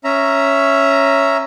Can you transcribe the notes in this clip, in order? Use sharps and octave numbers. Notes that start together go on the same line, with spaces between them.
C#4 E5 A#5